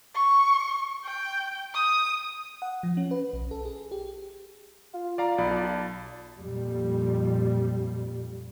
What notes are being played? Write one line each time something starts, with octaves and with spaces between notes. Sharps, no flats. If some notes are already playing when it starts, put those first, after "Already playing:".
C#6
G5
D#6
F#5
F3
C#4
B4
B1
A4
G#4
G4
F4
D5 F5 A#5
B1 F4 D5 B5
A5
F2 A#2 G3